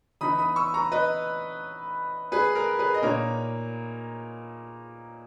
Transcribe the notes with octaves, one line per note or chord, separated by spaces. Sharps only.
E3 B3 D#4 B5 D#6
B5 D#6
C#6 E6
A#5 C#6
B4 D#5
G#4 B4
A#4
G#4 B4
D#5
A#2 A#3 D#4 A#4 C#5